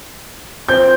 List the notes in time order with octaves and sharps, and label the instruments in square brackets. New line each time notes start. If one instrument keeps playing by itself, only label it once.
[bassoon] C4 [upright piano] G6